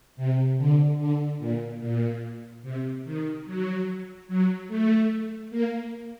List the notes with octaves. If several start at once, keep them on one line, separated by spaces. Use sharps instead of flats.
C3
D3
D3
A#2
A#2
C3
D#3
F#3
F#3
A3
A#3